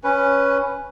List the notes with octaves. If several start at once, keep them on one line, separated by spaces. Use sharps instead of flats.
C#4 B4